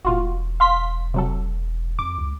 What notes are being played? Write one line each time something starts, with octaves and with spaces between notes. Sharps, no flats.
E1 A2 F4 F#4
F5 C6 B6
C3 F#3 A4
F2 D6
C#2